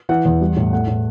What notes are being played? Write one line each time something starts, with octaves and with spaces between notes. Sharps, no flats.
E3 F#5
E2
G3
A2
A3 F#5
A2